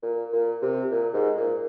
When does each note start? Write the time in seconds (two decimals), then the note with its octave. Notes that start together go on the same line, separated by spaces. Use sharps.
0.03 A#2
0.32 A#2
0.62 C3
0.91 A#2
1.14 G#2
1.37 A#2